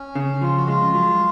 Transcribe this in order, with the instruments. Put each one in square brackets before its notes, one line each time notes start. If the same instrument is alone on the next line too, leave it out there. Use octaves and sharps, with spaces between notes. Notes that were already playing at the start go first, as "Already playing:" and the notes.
Already playing: [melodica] C#4
[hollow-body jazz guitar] C#3
[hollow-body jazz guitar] F3 [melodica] F4
[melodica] F#4
[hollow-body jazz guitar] G#3 [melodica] F4
[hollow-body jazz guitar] F#3